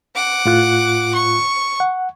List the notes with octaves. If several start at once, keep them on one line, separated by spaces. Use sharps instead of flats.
F#5 D6
A2 F4 F#6
C#6
F#5